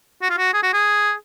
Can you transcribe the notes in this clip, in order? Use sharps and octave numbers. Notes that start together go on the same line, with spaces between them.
F#4
F4
F#4
G#4
F#4
G#4